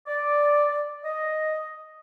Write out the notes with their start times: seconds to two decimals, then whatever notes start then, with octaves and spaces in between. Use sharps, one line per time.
0.07 D5
1.04 D#5